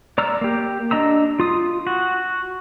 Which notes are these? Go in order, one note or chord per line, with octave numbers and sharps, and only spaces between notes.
D5 A#5 E6 F6
A#3 G4
D4 D#5 A#5 E6
F4 D#6
F#4